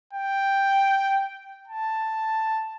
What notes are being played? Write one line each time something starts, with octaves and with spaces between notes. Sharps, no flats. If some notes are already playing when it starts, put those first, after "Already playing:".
G5
A5